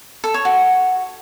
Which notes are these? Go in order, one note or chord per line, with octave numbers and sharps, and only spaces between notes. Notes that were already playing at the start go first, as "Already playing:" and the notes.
A4
C#5
F#4